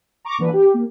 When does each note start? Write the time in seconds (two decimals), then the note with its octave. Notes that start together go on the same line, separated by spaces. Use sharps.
0.25 A#5 C#6 D6
0.38 A#2 D3 E3 B4
0.53 G4
0.74 A#3